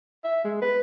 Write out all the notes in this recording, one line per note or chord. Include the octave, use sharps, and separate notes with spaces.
E5
G#3
B4